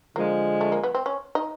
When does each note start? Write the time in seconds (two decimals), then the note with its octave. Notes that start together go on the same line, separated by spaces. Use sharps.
0.16 D3 F3 G#3 A#3
0.61 A3
0.72 A#3
0.83 B3
0.95 C4
1.06 C#4
1.35 D#4